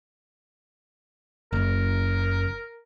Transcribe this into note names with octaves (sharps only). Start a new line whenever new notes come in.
F#1 A#4